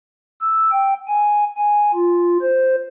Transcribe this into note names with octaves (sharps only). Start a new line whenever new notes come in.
E6
G5
G#5
G#5
F4
C5